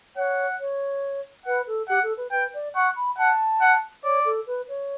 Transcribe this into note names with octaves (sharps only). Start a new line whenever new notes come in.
C#5 F#5
C#5
B4 F#5
A4
G4 F#5
A4
B4
B4 G5
D5
F#5 C#6
B5
F#5 A5
F#5
C#5 D5
A4
B4
C#5